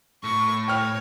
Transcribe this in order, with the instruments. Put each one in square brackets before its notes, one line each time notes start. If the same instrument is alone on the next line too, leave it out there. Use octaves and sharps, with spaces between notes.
[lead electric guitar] A2 [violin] C#6
[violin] C#5 [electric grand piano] G5 F6